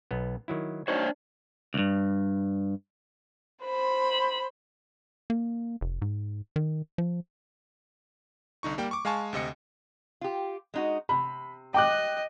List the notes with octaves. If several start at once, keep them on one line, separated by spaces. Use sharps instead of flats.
B1 B3
D#3 F#3 E4
D4 D#4 F#4 C5 C#5 F#5
C#2 G2
C5 B5
A#3
F1
G#2
D#3
F3
C2 D3 D#4 C#6
G3 A#3 G5
C#6 D6
G#3 F5 G#5 A5 C#6
D2 C3 D#5 C#7
F4 G4
G#3 D#4 F#4
C3 B5
D#5 G5 D6 F#6